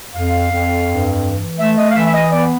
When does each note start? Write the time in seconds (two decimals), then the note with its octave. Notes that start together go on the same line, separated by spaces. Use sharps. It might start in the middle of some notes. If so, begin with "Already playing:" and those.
0.14 F2 F5
0.51 F2
0.87 G2
1.23 E3
1.59 A3 E5
1.78 D#5
1.91 F5
1.96 E3 E5
2.06 E5
2.14 D#5
2.32 B3 D5